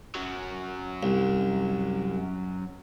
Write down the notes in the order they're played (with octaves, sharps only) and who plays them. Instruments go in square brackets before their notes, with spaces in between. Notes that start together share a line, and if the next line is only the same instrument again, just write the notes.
[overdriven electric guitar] F#2 F#3
[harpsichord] C2